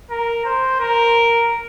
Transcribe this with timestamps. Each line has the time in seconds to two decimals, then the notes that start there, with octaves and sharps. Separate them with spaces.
0.10 A#4
0.45 C5
0.80 A#4